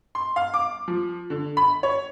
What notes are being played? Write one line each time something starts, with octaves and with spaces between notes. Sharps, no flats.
C6
F5
D6
F3
D3
B5
C#5